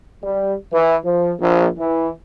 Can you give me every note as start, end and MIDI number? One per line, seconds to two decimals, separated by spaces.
0.23 0.52 55
0.72 0.95 52
1.04 1.33 53
1.39 1.67 34
1.77 2.09 52